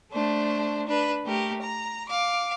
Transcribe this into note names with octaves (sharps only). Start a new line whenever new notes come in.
A3 D4 C5
D4 B4
A3 G4 A#4
A#5
F5 D6